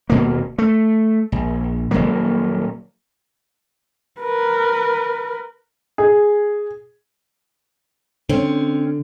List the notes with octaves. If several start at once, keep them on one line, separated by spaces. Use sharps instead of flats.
D#1 B2 A#3
A3
A#1
D#1 G#1 F#3 A#3
A#4 B4
G#4
D3 C4 C#4